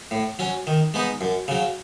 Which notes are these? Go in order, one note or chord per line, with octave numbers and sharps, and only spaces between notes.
A2
F#3 C#4
D#3
G#3 B3 D#4
F#2
C#3 F#3